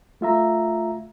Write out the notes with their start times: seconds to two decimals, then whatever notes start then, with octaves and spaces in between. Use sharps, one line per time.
0.21 A3 F4 E5 A#5